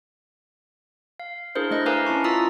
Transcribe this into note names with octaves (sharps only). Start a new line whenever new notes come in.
F5
D4 E4 G#4 A#4 C5
A3 D5 D#5 F#6
A#4 B4 F5 G#5 A#5 D6
C#4 E4 A5 C#6
F4 A#5 D#6 E6 A6 B6